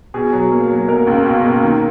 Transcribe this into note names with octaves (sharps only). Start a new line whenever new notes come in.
B2 G#4
F#3
A#3
F#3
A#3 A#4
C#2
B2
A#3
D#3